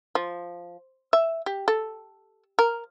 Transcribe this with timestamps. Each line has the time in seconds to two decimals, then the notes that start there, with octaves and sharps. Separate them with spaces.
0.15 F3
1.13 E5
1.46 G4
1.68 A4
2.59 A#4